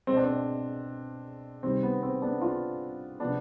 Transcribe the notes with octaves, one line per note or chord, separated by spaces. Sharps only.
B2 G#3 C4
D4
C4
C3 D#3 G3 C4
B3
C4
B3 D4
D4 F4
C3 F3 G#3 B3 D4